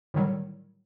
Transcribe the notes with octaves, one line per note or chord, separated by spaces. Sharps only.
A2 D3 D#3 F#3 G3